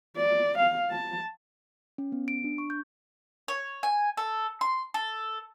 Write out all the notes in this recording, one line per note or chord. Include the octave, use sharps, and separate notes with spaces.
D5
F5
A5
C#4
B3
D7
D4
C#6
G6
C#5
G#5
A4
C6
A4